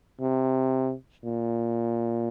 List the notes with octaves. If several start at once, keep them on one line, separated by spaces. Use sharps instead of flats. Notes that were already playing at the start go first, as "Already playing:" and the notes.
C3
A#2